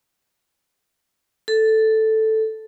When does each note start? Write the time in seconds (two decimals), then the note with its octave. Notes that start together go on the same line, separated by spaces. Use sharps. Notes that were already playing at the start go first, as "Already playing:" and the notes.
1.48 A4